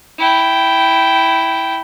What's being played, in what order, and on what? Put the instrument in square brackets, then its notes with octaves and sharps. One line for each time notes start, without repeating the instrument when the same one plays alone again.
[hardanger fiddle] E4 G5